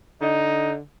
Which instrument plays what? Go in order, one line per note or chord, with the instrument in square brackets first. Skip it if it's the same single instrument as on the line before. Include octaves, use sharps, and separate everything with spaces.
[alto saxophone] D3 [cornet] D#4 [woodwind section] D#5